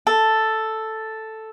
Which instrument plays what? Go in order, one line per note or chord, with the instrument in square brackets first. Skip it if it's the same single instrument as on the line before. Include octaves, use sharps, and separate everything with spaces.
[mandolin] A4